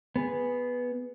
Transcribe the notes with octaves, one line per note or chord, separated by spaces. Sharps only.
B3 G#4